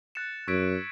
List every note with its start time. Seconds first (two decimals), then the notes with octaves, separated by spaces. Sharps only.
0.15 F#6 A6 C#7 E7
0.48 F#2 C#6 E6 G#6 B6 D7